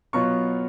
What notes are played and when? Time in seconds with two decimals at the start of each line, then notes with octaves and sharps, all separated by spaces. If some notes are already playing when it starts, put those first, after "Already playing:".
0.13 B2 F#3 B3 F4 C#6